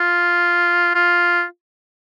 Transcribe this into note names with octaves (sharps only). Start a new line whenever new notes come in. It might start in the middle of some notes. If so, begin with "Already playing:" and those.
Already playing: F4
F4